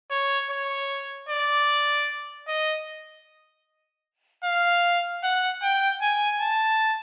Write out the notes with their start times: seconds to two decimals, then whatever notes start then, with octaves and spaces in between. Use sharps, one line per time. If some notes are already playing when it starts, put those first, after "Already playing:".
0.11 C#5
0.50 C#5
1.29 D5
2.48 D#5
4.44 F5
5.24 F#5
5.63 G5
6.02 G#5
6.41 A5